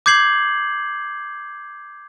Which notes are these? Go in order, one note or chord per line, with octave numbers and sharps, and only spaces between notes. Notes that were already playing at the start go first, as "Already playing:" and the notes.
D6 G6 G#6 C7 F#7